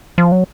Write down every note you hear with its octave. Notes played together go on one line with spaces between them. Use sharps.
F3
F#3